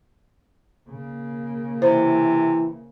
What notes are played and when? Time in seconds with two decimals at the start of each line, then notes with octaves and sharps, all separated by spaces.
0.89 C#3 A#3
1.82 C3 E3 C5